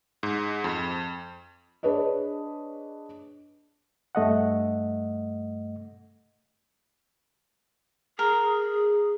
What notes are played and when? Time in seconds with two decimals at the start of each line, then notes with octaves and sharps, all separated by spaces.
0.23 G#2
0.64 F2
1.83 D4 G#4 B4 C#5 D#5
4.15 G2 A3 D#5 F#5
8.19 G#4 A#4